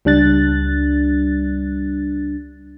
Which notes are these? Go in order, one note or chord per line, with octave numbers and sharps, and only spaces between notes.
C#2 G3 D4 F#6 A6